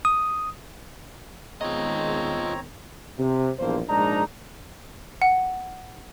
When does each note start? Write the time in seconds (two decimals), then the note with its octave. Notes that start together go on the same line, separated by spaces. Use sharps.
0.05 D#6
1.61 D#3 G#3 B3 C4 F4 C#5 D#5 A#5
3.18 C3
3.59 A#1 E2 G2 A#3 C5
3.89 A#1 G#2 D4 D#4 A#5
5.22 F#5